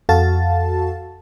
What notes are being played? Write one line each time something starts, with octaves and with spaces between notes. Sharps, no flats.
F2 F#4 A4 F5 A5 A6